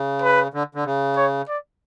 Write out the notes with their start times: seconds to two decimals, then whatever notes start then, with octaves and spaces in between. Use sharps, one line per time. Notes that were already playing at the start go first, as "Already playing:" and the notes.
Already playing: C#3
0.22 B4
0.54 D3
0.75 D3
0.85 C#3
1.16 C#5
1.48 D5